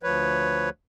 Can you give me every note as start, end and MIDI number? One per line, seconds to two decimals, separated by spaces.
0.03 0.69 38
0.03 0.69 53
0.03 0.69 71
0.03 0.69 73